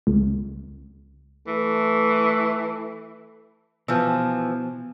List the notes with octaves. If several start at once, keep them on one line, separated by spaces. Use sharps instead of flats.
C#2
E3 A3
B2 E3 F3